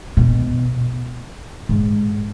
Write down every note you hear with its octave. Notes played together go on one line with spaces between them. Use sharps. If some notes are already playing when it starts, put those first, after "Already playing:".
B2
G#2